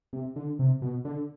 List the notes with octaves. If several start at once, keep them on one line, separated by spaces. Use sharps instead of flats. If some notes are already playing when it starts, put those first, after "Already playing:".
C3
D3
C3
B2
D3